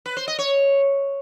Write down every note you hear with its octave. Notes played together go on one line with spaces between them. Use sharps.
B4
C5
D#5
C#5